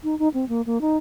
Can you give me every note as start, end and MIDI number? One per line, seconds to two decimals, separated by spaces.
0.04 0.18 63
0.19 0.29 63
0.34 0.45 60
0.49 0.62 58
0.66 0.81 58
0.81 0.97 63